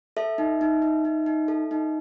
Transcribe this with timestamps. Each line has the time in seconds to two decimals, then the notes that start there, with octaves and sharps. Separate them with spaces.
0.17 A4 E5
0.38 D#4
0.61 D#4
0.82 D#4
1.05 D#4
1.26 D#4
1.48 A4
1.71 D#4